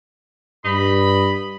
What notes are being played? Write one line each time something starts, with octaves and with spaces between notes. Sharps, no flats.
G2 D#5 B5